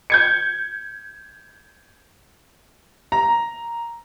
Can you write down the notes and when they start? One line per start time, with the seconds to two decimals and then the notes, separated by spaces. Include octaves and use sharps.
0.10 G6 G#6 C#7
3.12 A#5